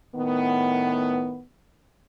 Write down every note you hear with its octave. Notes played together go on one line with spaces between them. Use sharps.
A2 D#3 B3